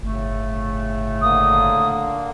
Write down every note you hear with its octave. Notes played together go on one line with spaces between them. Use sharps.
G1 A2 C#3 A3
D3 A#3 D#6